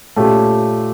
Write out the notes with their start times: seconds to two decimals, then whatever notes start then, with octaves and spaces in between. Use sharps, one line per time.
0.16 A#2 A3 C#4 G4